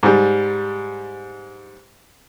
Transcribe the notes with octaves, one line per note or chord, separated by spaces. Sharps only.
G#2 G3